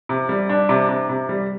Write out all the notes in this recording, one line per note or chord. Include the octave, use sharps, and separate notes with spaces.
C3
G3
D4
C3
C3
C3
G3